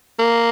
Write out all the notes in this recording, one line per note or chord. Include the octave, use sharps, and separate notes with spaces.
A#3